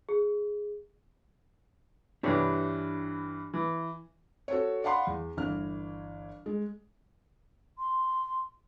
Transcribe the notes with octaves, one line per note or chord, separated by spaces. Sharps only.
G#4
G2 E3 D4 G4 C#5
E3
F#4 A4 C5 C#5
D5 F5 F#5 B5 C6
E2
G1 E3 F6
G#3
C6